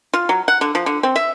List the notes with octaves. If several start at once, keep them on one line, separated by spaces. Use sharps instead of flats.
F4
F#3
F#5
D3
F3
D3
C4
E5